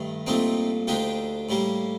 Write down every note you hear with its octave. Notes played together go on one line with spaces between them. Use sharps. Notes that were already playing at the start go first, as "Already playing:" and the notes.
Already playing: G2 D#3 A3
C2 A#2 A3 C4 D#4
D2 D3 F3 D#4 G4
A2 G3 A#3